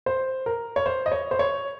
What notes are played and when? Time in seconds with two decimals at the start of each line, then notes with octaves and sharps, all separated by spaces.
0.06 C5
0.46 A#4
0.76 C#5
0.86 C5
1.06 D#5
1.12 C#5
1.31 C5
1.39 C#5